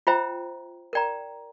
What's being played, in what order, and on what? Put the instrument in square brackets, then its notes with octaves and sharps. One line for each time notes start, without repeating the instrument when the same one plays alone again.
[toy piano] F4 C5 E5 G5 A#5
A#4 D5 G5 A#5